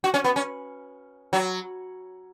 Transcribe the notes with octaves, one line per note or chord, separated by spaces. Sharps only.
F#4
C#4
B3
C#4
F#3